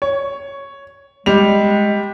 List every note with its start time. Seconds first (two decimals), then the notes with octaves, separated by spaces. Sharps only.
0.02 C#5
1.26 G3 G#3 F7